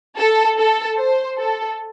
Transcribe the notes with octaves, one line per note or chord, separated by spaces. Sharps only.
A4
A4
C5
A4